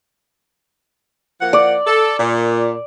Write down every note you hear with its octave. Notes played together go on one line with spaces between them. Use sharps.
F3 A#3 F#5
D5
A4
A#2